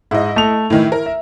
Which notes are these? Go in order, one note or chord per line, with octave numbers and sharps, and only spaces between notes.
G#2 E4 D#5
A3 F7
A2 D#3 E3 E4
A#4
E5